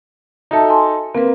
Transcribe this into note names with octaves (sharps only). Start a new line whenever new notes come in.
D#4 F#4 A4 E5 A5
G#5 A5 C6
A#3 C4 B4